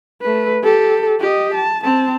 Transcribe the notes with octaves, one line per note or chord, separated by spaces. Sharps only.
A3 B4
G4 A4
G4 D#5
A5
C4 A5